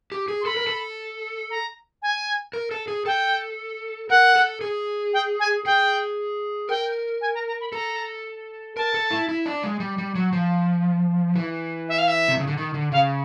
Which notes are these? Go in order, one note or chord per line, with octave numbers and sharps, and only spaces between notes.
G4
G#4
C6
A4 B5
A#4
A4
A#5
G#5
A#4
A4
G#4
A4 G5
A#4 F#5
A4
G#4
G5
G#5
G#4 G5
A#4 G5
G#5
A#5
A#5
B5
A4 A#5
A#4 A5
A4
E4
E4
D4
G#3
G3
G3
F#3
F3
E3
E5
F5
E5
C3
C#3
D3
D#3
D3
C#3 F5